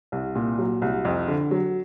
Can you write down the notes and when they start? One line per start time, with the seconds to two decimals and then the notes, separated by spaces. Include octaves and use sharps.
0.12 C2
0.35 A#2
0.58 F#3
0.82 C2
1.05 F2
1.28 D3
1.51 F#3